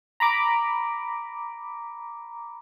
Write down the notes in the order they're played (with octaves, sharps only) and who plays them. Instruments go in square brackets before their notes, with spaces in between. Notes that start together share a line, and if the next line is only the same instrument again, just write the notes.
[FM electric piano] A#5 B5 D6